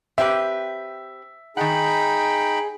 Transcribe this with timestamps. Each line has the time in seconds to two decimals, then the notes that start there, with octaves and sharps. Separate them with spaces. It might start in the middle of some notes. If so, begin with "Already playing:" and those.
0.18 C4 G4 B4 E5
1.57 D#3 D#4 G#4 F#5 G5 B5